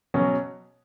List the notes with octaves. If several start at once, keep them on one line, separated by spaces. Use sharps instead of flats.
B2 F#3 C#4